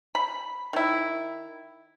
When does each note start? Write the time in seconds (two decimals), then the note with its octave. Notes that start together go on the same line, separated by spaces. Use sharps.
0.15 B5
0.73 D#3 E4